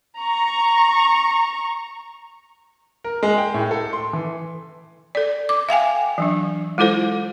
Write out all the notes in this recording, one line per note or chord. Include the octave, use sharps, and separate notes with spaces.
A#5 C#6
A#4
G#3
G5
A2
A4
C6
E3
A4 D5
D6
E5 F5 G5 G#5
E3 F#3 D4
G#3 E4 F4 A4 C5